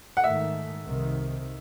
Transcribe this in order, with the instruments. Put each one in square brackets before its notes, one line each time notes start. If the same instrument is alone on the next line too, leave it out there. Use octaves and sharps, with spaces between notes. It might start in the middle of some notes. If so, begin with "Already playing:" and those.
[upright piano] F#5
[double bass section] G#2 D#3 A3 [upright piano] E5
[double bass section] C2 C3 D#3